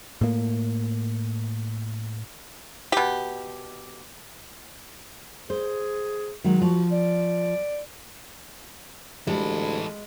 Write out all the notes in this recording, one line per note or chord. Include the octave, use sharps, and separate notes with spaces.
A2 A#3
B2 G4
G#4 C5
D#3 F#3 G#3
F3 F#4
D5
D2 E3 G3 G#3 A4